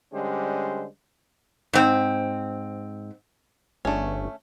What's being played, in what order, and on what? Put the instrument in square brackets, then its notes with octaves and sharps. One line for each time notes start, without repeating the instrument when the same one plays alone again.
[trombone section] D3 G3 G#3 C#4 G4 C5
[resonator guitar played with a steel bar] G#2 C4
[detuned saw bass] G1 [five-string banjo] A3 C#4 [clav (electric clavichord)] D4 G#4